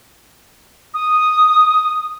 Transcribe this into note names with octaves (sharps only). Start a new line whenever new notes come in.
D#6